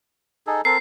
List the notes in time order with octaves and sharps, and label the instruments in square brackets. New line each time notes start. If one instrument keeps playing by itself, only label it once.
[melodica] D#4 G#4 A4
[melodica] C4 A4 A#4 [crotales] C7